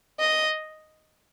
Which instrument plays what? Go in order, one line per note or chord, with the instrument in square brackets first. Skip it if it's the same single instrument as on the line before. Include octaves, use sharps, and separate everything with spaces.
[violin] D#5